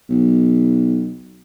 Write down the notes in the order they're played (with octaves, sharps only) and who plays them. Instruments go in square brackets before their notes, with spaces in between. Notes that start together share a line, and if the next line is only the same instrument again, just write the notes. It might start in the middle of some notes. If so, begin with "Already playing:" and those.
[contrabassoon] B1